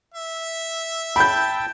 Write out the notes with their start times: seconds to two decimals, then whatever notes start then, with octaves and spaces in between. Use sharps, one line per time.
0.15 E5
1.16 G5 A5 B5 G6